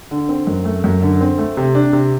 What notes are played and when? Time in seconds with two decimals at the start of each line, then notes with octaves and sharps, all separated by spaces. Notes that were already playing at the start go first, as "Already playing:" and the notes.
0.11 D3
0.29 C4
0.47 F#2
0.65 A3
0.84 F#2
1.02 D3
1.21 C4
1.38 A3
1.57 C3
1.75 D4
1.93 C3